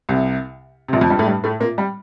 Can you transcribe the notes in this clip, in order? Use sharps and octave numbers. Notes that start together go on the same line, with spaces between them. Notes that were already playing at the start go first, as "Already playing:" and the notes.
C2 C3
C3
A#1 A#2
F2 F3
G2 G3
A2 A3
G2 G3
A2 A3
A#2 A#3
G3